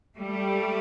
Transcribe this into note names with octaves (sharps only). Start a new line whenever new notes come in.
G3 A3